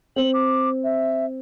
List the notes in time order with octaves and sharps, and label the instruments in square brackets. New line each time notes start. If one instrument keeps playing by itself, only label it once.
[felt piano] C4 [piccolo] F#7
[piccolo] D6
E5